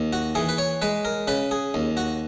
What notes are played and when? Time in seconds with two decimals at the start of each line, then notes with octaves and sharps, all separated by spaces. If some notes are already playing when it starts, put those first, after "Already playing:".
Already playing: D#2
0.13 F#4
0.35 E3 G#4
0.49 B4
0.58 C#5
0.82 G#3 B4
1.05 A#4
1.28 C#3 B4
1.51 G#4
1.74 D#2
1.97 F#4